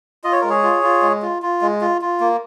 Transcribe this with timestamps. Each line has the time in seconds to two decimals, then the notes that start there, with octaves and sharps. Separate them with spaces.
0.24 F4 D#5
0.32 C#5
0.41 G#3 A#4
0.49 G#4 C#5
0.63 F4
0.83 F4
1.02 G#3
1.22 F4
1.42 F4
1.62 G#3
1.81 F4
2.01 F4
2.21 A#3